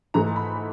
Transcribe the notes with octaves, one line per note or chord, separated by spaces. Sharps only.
G#2 E3 A3 A#5
B5